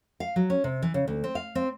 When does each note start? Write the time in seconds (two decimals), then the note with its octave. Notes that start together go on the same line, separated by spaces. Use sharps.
0.20 F5
0.36 F#3
0.50 C#4
0.64 C3
0.82 E3
0.94 C#3
1.08 D2
1.24 C4
1.35 F5
1.55 C4